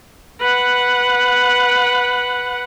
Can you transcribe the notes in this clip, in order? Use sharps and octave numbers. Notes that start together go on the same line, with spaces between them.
B4 F#5